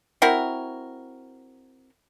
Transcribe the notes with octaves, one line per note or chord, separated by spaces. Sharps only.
C4 E4 F#4 A#4